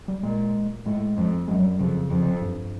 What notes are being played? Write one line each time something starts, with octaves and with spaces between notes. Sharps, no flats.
G3
A#2 G#3
A2 G#3
F2
F#2 G#3
F#3
G3
F2 C#3
F2
G2